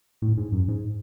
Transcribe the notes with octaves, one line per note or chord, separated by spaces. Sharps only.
A2
G#2
F#2
G#2